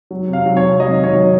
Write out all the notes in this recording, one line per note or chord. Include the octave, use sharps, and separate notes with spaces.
F#3
C3
F5
F#3
C#5
C3
F#3 D#5
D#3
C#5
F#3